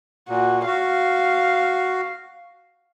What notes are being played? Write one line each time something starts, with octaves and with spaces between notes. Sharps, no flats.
A#2 F#4
F#4 F5